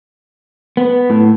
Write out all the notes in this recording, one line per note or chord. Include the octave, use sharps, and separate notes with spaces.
B3
A2